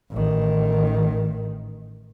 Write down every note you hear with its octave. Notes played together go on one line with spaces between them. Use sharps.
A1 D#3